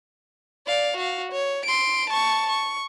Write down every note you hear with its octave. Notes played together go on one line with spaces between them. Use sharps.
D5 F5
F#4 F5
C#5
C6 D7
A5 C#6
C#6